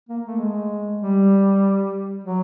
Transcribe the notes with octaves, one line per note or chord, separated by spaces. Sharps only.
A#3
A3
G#3
G3
F#3